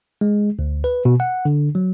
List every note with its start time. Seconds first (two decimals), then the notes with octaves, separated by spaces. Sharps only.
0.21 G#3
0.59 D2
0.84 B4
1.05 B2
1.20 F#5
1.45 D3
1.75 F#3